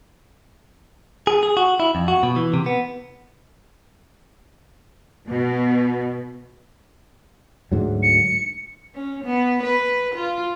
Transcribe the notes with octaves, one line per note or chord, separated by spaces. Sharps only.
G#4
G#4
F#4
E4
F2
F#4
B2
E3
C3
B3
B2
D2 G#2 F#3
C#7
C#4
B3
B4
F4